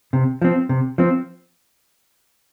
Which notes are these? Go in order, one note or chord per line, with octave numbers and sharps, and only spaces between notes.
C3
F3 C4
C3
F3 C4